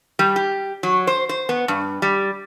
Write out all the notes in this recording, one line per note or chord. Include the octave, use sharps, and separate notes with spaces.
G3
G4
F#3
C5
C5
B3
G2
G3